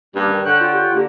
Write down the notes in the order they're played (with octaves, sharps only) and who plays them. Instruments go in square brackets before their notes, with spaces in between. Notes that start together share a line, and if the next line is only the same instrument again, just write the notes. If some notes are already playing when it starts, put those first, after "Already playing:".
[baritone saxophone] G2 [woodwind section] A#3 C#4 G4
[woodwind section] D#3
[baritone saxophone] D3 [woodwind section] C#5 F#5 G5 [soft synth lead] F#6
[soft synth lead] F4
[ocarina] G4
[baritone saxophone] D3 [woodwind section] A#3